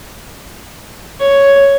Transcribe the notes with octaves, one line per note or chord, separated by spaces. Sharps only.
C#5